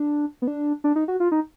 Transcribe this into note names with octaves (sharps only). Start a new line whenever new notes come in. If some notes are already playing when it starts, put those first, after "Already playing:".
Already playing: D4
B3
D4
D4
D#4
F#4
F4
D#4